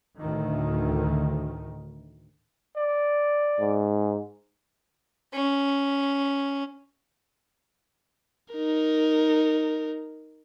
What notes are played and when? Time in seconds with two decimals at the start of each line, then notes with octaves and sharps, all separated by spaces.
0.20 D2 A2 D#3
2.77 D5
3.59 G#2
5.33 C#4
8.54 D#4 A#4